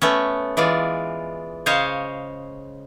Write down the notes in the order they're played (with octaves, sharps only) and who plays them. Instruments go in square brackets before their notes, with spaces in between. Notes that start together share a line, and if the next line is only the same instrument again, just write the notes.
[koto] A3 B3 C#4
E3 G#3 F4 D5
C#3 C5 C#5 D#5 F5